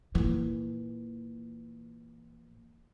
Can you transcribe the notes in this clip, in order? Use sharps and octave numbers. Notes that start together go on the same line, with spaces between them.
A#2 E3